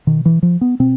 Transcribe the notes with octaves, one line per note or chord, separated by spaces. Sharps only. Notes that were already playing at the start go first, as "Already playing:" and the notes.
B2 D#3
E3
F3
B3
B2 C4